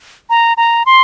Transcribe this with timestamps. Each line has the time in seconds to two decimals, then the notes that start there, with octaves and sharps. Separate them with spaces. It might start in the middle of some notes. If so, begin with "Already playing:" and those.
0.30 A#5
0.57 A#5
0.86 C6